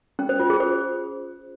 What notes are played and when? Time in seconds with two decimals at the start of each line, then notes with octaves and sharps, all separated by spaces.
0.19 C#4
0.29 C5
0.39 F4
0.50 G#4
0.60 C5